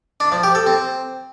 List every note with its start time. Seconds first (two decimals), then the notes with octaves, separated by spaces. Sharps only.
0.20 D4
0.32 F3
0.43 G4
0.55 A4
0.67 C4